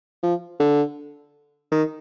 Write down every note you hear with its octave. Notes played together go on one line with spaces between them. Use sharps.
F3
D3
D#3